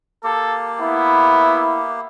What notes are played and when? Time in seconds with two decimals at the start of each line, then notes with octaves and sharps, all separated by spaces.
0.24 A#3 G4 A4
0.81 B3 E4